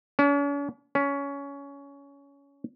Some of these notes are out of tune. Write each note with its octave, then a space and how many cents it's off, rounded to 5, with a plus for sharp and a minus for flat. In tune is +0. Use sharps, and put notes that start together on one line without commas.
C#4 +45
C#4 +20